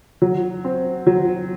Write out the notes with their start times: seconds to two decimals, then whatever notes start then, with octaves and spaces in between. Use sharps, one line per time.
0.22 F#3
0.65 C4
1.07 F#3